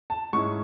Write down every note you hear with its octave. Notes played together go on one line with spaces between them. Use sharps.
A5
G#2 G#3 C#4 E4 C#6